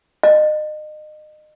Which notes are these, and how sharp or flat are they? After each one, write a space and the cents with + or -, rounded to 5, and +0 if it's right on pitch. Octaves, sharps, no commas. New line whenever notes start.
D#5 -30